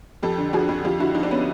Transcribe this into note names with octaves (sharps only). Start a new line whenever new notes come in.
F2 G4 A4
D3
F3 F#4 G#4
F2
F2 F4 G4
D3 E4 F#4
F3 D#4 F4
D4
B3 C#4